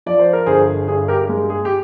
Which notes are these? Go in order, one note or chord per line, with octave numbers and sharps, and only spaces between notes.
F3 D5
C5
A#4
G1 G#4 C5
G2 G#4
G4 A#4
G#3
G#4
G4